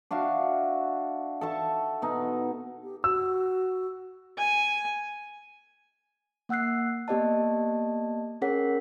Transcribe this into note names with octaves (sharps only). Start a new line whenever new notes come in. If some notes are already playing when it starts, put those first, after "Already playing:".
D4 F#4 E5 F5
A4 E5 A5 C#6
B2 D#4
G4
F#4 E6
G#5
A#3 F#5 E6 F#6 C7
A#3 B3 G4 D5 D#5 A5
C#4 G#4 A#4 C#5 F#5 B6